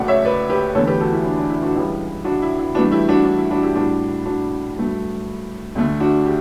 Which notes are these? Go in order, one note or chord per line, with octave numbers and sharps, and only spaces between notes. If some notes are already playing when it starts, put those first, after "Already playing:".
Already playing: C#2 C#3 F#3 A3 D5 F#5
C#5 E5
B4 D5
G4 B4
E2 D3 A3 A4 C#5
G4 B4
F#4 A4
E4 G4
D4
D4
E4
D4 F#4
C#2 C#3 E3 G3 E4
D4 F#4
E4
E4
G2 E3 A3 D4 F#4
E4 G4
D4 F#4
D4
E4
D4 F#4
E4 G4
A2 G3 D4 F#4
D4 F#4
G2 F#3 A3
D2 D3 A3
D4 F#4
G4